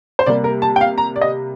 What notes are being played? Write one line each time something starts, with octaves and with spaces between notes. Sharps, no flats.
C5
C3 G3 A#3 D5
A#4
A5
G5
F5
A#5
D5
D#5